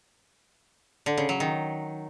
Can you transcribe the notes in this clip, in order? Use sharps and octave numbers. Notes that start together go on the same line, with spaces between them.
D3
C#3
F#3
D#3